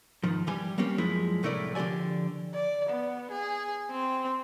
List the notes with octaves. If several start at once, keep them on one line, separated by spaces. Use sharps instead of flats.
G#2 D#3 F3
E3 G3 G4 G#5
G3 A#3 C4 C#4 G4
F#2 F3 G#3 E4
C2 A2 A3 E4 A#4 D5
D3 F3 G4 D5 G#5
D5
B3
G#4
C4